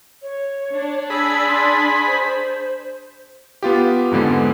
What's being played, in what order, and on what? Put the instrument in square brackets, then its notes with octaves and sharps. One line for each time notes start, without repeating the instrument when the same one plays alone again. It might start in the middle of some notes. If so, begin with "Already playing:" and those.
[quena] C#5
[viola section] D4
[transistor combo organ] G#4 B5 [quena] E6
[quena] C6
C5
[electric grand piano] B3 F4 G4
F2 G#2 D3 G#3 B3